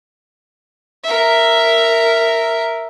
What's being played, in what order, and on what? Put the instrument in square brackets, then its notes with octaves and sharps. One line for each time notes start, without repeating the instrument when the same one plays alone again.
[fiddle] A#4 E5